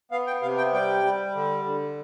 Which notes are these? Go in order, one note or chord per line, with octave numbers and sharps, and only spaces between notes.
B3 F5
G5
C3 F5
G5
G3 G5
G3
D3
D3